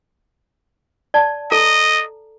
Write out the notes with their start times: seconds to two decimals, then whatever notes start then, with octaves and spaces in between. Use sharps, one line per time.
1.14 D5 A5
1.51 A4 D#5 A#5